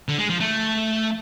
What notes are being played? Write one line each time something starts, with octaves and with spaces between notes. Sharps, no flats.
D3
G#3
F3
A3